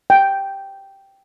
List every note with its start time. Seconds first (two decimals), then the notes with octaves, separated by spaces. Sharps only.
0.10 G5